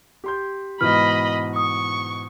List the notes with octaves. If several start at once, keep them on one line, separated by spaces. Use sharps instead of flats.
G4 C6 G6
G#2 B2 E3 D#5 B5 F6
C#6 D#6